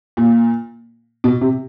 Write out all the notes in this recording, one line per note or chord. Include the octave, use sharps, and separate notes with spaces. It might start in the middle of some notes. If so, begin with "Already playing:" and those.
A#2
B2
C3